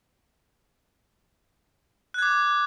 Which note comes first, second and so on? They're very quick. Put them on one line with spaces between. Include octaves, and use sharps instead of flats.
F#6 G#6 D6